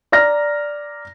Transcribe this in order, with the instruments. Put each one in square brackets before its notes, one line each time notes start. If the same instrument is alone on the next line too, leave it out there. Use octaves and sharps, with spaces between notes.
[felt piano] D5 A#5 F6 A#6